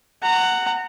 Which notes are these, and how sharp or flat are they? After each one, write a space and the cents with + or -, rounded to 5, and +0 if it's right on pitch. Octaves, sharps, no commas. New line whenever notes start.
F#5 +5 A#5 -25